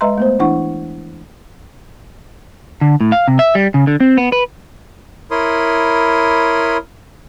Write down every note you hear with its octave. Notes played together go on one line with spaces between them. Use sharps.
G#3 B4 D#5 E5 A#5 C6
A3 B3 C5
E3 D4 E4 F#5 C#6
D3
A2
F5
C3
E5
G3
C#3
D3
C4
B3
B4
E4 A#4 C#5 B5 C6 D#6